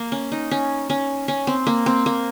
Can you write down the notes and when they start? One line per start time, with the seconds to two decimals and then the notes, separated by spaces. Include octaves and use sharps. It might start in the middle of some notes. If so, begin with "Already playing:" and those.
Already playing: A#3
0.12 C#4
0.32 D#4
0.51 C#4
0.90 C#4
1.28 C#4
1.47 C4
1.67 A#3
1.86 C4
2.06 A#3